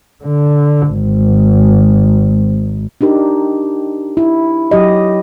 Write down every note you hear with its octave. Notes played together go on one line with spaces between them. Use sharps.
D3
G#1
D4 D#4 G4 A#4
E4
F#3 G4 D#5